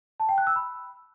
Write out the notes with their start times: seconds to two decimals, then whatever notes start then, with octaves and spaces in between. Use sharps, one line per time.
0.20 A5
0.29 G5
0.38 F#6
0.47 E6
0.56 B5